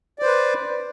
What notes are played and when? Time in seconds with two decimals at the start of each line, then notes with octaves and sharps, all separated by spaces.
0.19 D5
0.22 C5
0.26 B4